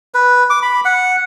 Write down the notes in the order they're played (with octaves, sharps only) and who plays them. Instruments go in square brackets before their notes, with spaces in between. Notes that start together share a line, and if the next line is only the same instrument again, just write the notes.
[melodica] B4
D6
B5
F#5